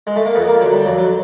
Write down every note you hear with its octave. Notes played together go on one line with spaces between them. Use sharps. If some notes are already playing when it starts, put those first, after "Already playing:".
G#3
A3
A#3
F2 B3
A#3
D3 F#3
G3
F2 F#3
F#3